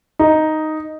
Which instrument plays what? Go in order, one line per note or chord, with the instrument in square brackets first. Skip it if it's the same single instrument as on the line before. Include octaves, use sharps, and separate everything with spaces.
[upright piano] D#4